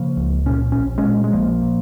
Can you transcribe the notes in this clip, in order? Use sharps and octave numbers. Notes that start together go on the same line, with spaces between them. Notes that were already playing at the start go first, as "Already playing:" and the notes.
Already playing: C#3 F3 A#3
C#2
A#2 C#4
A#1 C#4
G#3 C#4
A#2
G#3
A#1 F3 A#3
A#2